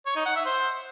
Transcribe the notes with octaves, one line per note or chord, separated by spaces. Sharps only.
C#5
D#4
F#5
E5
C5